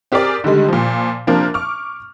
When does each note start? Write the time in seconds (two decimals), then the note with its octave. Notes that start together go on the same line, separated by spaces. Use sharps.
0.12 C4 G4 G#4 A#4 D5
0.44 D3 D#3 G3 G#3
0.68 A#2 F3
1.27 C3 F3 A#3 D4 A#4
1.54 C#6 D6 F6